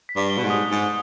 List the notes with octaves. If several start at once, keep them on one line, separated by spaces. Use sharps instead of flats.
B6
G2
G7
B2
G#2
D#6
G#2 G7